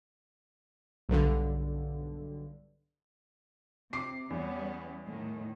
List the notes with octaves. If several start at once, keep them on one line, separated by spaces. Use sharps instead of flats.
B1 G2 D3
C3 D6 C7
E2 G3 B3 C#4
A2 D#3